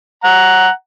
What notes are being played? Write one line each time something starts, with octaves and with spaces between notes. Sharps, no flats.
F#5 A#5